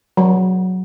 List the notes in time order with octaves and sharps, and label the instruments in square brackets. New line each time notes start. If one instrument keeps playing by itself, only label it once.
[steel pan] F#3